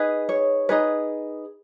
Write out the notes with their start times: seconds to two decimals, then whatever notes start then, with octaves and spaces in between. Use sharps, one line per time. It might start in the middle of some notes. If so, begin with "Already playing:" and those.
Already playing: D#4 G#4 B4
0.29 C#5
0.69 D#4 G#4 B4